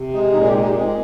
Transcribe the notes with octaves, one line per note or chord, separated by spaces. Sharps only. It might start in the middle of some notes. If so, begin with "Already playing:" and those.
Already playing: C3
G#3 D#4
A#2 D#4
G#4
G4
G#3
D#4
G#3 C4